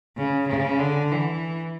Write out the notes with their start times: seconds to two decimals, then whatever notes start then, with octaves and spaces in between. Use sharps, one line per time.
0.17 C#3
0.47 C#3
0.79 D3
1.11 E3